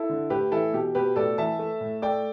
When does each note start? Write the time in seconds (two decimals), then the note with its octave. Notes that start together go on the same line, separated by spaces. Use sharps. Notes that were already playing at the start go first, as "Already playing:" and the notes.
Already playing: E4 A4
0.09 D3
0.30 A2 G4 B4
0.52 E3 E4 A4
0.73 B2 G4
0.95 B2 G4 B4
1.16 A2 A4 D5
1.38 E3 E5 A5
1.59 A3
1.81 A2
2.02 A3 D5 G5